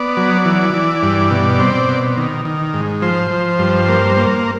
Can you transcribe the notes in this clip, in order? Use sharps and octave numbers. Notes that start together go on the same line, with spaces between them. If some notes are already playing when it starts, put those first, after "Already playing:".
Already playing: B3 D5
F#3
E3
E3
G2
B2
C4
B2
D#3
D#3
G#2
F3 C5
F3
G2
A#3
A#3